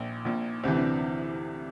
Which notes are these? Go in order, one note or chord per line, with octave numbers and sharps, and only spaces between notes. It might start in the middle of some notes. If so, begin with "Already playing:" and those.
Already playing: A#1 A#2
A#1 A#2
D2 C3 E3 C4
D4